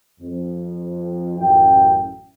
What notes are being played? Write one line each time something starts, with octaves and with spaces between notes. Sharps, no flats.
F2
A1 F#2 E4 G5